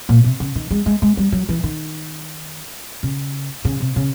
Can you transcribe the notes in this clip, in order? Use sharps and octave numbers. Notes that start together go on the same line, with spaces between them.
A#2
C3
C#3
D#3
G#3
G#3
G#3
G3
F#3
E3
D#3
C#3
C#3
C3
C#3